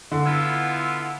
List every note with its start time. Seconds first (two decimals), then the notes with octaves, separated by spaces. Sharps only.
0.11 D3
0.26 B3 E4 F4